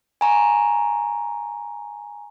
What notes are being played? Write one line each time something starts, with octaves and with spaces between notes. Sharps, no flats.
G#5 A#5 C#6